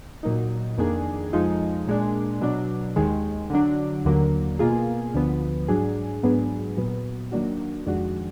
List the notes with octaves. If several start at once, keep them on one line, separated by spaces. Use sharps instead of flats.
A#2 F#3 A#3 D#4
F2 D#3 A#3 D4 G#4
F2 F3 G#3 D#4
A#2 G#3 D4
B2 F#3 D4
D#2 D#3 G#3
D3 F#3 D4
D#2 D3 F#3 A#3
B2 A#3 F4 G#4
D2 D3 F3 B3
G#2 F#3 D4 G#4
G#2 F#3 B3 D4 G#4
A#2 F#3 B3
D#3 F#3 A#3 D4 F#4
F2 D#3 G#3 D4 F#4